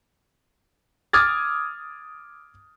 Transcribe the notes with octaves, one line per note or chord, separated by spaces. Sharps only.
D6 D#6 F6 G#6 A6